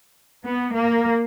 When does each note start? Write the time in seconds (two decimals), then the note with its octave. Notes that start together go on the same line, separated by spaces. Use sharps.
0.45 B3
0.74 A#3